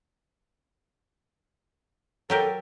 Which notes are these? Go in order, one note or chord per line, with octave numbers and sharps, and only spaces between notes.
F#3 G4 A4 A#4